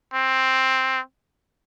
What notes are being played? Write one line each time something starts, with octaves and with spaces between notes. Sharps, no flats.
C4